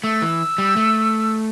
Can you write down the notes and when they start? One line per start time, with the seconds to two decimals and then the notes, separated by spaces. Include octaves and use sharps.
0.03 A3 E6
0.22 E3
0.58 G3
0.76 A3